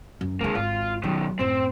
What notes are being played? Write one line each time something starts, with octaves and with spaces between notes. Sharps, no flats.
F#2
D3 G#3 A#3 E4
G#1 F4
B2 D#3 F#3
F#2 A2 C4